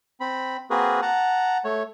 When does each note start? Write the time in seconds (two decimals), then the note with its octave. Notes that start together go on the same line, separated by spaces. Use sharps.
0.20 C4 B5
0.70 A#3 C4 F#4 G#4 A#4 B4
1.02 F#5 A5 A#5
1.65 A3 C#5